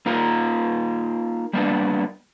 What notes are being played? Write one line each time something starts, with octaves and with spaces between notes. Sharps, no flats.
A#3 D#4 F4 A#4
G3 A#3 B3 D4